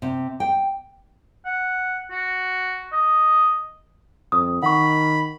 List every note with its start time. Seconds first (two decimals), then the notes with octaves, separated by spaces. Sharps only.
0.02 C3
0.40 G5
1.45 F#5
2.11 F#4
2.92 D#5
4.32 F2 D#6
4.63 D#3 F#5 B5 C#6